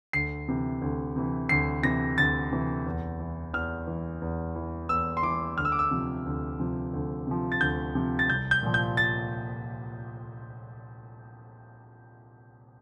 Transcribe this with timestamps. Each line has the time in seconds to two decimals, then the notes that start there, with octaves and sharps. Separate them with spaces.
0.13 D2 C7
0.48 C3 E3
0.82 D2
1.16 C3 E3
1.49 D2 C7
1.83 C3 E3 A#6
2.18 D2 A6
2.52 C3 E3
2.86 E2
3.20 E3
3.53 E2 F6
3.87 E3
4.22 E2
4.56 E3
4.89 E2 E6
5.17 C6
5.23 E3 D6
5.57 D2 F6
5.65 E6
5.72 D6
5.79 E6
5.91 C3 F3
6.26 D2
6.59 C3 F3
6.93 D2
7.27 C3 F3
7.52 A6
7.61 D2 G6
7.95 C3 F3
8.19 A6
8.29 C2 G6
8.51 G6
8.63 A#2 F3
8.74 G6
8.97 A6